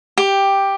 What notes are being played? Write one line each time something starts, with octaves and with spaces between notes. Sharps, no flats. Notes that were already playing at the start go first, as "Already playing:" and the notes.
G4